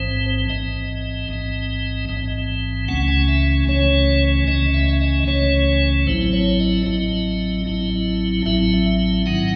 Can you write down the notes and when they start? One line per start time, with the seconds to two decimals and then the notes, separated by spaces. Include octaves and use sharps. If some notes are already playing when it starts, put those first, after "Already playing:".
Already playing: A1 G#2 E3 C4 C5
0.49 A1 G#2 E3 C4 D#5
1.28 A1 G#2 E3 C4
2.09 A1 G#2 E3 C4
2.88 C#2 C#3 E3 A3 C#4 F#5
3.08 G#5
3.28 E5
3.68 C#2 C#3 E3 A3 C#4 C#5
4.47 C#2 C#3 E3 A3 C#4 D#5
4.74 E5
5.01 D#5
5.27 C#2 C#3 E3 A3 C#4 C#5
6.07 A1 A2 F#3 C4 E4 C5
6.33 C#5
6.60 D#5
6.86 A1 A2 F#3 C4 E4
7.66 A1 A2 F#3 C4 E4
8.46 A1 A2 F#3 C4 E4 E5
8.86 E5
9.26 G#2 D#3 F#3 C4 D#4 F#5